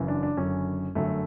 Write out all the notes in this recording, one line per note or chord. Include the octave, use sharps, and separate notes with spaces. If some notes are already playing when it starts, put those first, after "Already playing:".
Already playing: F#1 F#2 C#3 E3
D4
D4
F#1 F#2 D3 C#4
G1 F#2 D3 A3